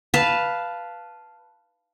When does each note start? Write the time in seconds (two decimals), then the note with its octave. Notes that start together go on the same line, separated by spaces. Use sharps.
0.14 B4 F5 A5